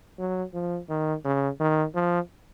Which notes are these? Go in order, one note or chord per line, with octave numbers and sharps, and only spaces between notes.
F#3
F3
D#3
C#3
D#3
F3